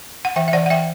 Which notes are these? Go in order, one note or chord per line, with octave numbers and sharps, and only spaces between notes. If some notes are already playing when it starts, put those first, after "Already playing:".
F#5
E3 E5 G5
E5
E3 D5 F#5
F#5
E3 E5 G5